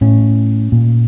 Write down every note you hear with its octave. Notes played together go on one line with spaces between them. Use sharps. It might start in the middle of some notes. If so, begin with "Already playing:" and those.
A2 C#4
A#2